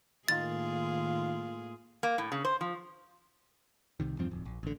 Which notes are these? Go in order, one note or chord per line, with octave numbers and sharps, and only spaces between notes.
A2 D#3 A#3 F4 G#4 A6
A#3
A2
C#3
C5
F3
C2 C3 D#3
E2 G2 F3 C4
D1 F2
A#1
A1 D3